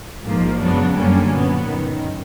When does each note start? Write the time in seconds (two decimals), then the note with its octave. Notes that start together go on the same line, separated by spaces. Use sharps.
0.23 A#1 G#2 F3 A#3
0.59 F#2 C#3 F#3 B3 D4
0.94 F#2 D3 G3 A#3 C#4
1.29 A#2 F#3 B3
1.64 G1 F#2 D#3